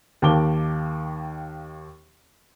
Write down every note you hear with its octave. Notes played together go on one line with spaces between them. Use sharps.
D#2 D#3 F5 A5 D6 G7